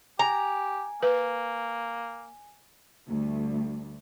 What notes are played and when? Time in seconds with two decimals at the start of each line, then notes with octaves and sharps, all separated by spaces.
0.19 G4 G#5 A#5
1.03 A#3 B4
3.08 D2 G3 A3